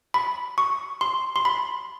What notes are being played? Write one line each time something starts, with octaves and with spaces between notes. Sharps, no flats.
B5
C#6
C6
C6
B5